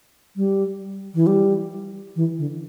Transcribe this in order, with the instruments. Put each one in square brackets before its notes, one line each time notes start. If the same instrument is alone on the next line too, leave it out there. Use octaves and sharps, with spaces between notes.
[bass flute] G3
E3
G3
E3
D3